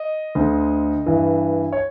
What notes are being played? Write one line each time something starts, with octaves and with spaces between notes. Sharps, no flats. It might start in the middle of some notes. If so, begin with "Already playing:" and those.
Already playing: D#5
D2 D3
G2 E3
C#5